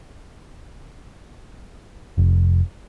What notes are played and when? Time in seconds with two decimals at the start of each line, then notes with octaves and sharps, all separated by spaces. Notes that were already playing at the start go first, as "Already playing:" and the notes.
2.18 F1